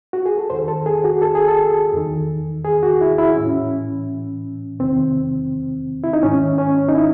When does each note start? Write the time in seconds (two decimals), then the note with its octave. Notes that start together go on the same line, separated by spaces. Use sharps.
0.13 F#4
0.26 G#4
0.38 A4
0.50 E2 D#3 C5
0.68 A4
0.86 G#4
1.04 F#4
1.22 A4
1.35 G#4
1.48 A4
1.93 E2 D#3
2.65 G#4
2.83 F#4
3.01 E4
3.18 E4
3.36 A2 E3 C#4
4.79 E2 C3 D#3 C4
6.04 E4
6.13 D#4
6.23 G#2 D#3 C#4
6.58 C#4
6.89 D#4
6.95 E4